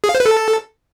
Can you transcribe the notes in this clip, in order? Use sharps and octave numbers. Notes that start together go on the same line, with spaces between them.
G#4
F5
C5
B4
A4